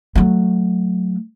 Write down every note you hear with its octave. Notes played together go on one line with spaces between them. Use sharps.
F#3 A3